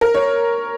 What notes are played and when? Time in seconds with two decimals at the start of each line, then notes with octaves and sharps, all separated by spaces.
0.01 A#4
0.14 C#5